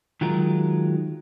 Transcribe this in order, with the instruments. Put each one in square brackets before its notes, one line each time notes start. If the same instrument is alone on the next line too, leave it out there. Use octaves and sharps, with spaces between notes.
[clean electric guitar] D#3 F#3 G#3 F4 A#4